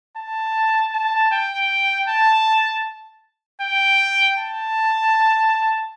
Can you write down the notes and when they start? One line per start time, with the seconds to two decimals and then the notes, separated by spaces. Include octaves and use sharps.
0.17 A5
0.93 A5
1.31 G5
2.07 A5
3.61 G5
4.37 A5